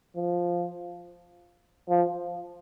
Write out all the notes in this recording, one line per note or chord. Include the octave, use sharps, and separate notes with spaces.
F3
F3